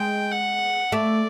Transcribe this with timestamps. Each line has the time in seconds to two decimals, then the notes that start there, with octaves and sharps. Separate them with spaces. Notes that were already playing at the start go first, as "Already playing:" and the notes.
Already playing: G#3 G5
0.31 F#5
0.92 A3 D5